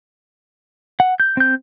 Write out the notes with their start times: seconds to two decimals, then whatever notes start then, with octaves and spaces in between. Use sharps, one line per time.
1.00 F#5
1.20 G6
1.37 C4 G6